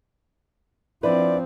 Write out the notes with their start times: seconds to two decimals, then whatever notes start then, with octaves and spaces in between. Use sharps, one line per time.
1.03 F3 C4 D4 E4 B4 D5